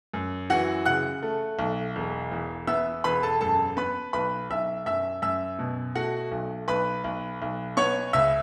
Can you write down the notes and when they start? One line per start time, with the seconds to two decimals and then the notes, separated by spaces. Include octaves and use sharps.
0.14 F#2
0.50 E3 F#4 F#5
0.86 C#3 F#5 F#6
1.23 A3
1.59 B1
1.96 E1
2.32 E2
2.67 B3 E5 E6
3.04 E1 B4 B5
3.23 A4 A5
3.41 F#2 A4 A5
3.77 B3 B4 B5
4.13 B1 B4 B5
4.50 B1 E5 E6
4.86 F#2 E5 E6
5.22 F#2 E5 E6
5.59 B2
5.95 A3 F#4 F#5
6.32 B1
6.68 B1 B4 B5
7.04 B1
7.42 B1
7.77 B3 C#5 C#6
8.13 C#2 E5 E6